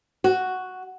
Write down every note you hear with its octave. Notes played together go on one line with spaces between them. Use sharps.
F#4